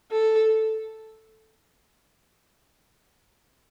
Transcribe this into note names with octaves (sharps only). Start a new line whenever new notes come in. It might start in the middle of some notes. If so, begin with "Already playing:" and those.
A4